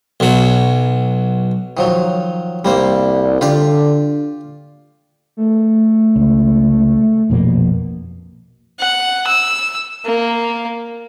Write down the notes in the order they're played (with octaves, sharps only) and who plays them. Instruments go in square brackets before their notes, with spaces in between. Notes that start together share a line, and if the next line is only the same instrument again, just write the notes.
[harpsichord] B1 F#3
D#3 F3 F#3
[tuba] C2 [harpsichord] G3 A#3 C5
[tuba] D3 [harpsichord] F4 G4 D5
[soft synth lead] A3
[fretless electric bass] C#2
[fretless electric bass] A#1 F2 A#3 [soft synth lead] B2
[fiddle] F#5
E6
A#3